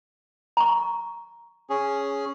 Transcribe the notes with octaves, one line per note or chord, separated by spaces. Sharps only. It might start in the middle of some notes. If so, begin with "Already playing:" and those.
A#5 C#6
C#4 G#4